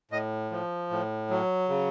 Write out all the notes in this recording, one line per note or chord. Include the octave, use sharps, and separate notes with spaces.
A2 D#5
F3
A2
F#3
C#3